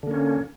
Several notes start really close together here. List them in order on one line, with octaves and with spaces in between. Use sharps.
D3 A#3 C#4